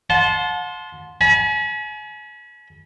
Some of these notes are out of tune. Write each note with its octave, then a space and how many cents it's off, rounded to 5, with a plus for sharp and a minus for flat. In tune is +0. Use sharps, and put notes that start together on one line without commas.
F#5 -45 A5 -25 C6 +0
G#5 +35 B5 -35